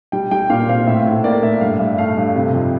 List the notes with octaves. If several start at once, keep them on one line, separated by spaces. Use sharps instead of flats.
G3 G5
G3 G5
A#2 F5
C4 F5
A2 E5
A2
A#3 D5
A2 E5
G2 F5
G2 E5
A3 F5
G2
C3
F2